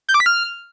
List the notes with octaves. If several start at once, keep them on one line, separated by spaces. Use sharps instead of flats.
G6
D6
B6
F6